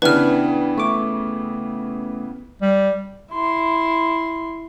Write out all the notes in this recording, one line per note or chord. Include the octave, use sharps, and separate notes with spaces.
C#3 E3 B3 D4 B4 G5 B5 F6
A3 C#6 D6
G3
E4 C6